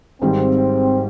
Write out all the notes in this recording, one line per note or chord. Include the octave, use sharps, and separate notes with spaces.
G#1 G#2 D#3 G3 C4